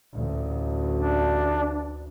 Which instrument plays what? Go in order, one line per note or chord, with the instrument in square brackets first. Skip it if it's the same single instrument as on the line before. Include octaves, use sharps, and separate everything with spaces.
[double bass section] A1 D2
[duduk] D4